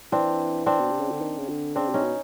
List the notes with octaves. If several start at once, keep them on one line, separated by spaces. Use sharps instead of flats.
E3 C4 D4
C4 D4
B2
C3
C#3
D3
D#3
C#3
D3
C#3 C4 D4
C3
C#4 D#4
B2